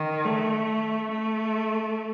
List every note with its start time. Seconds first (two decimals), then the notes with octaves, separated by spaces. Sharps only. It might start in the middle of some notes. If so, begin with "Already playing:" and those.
Already playing: D#3
0.25 A3
1.12 A3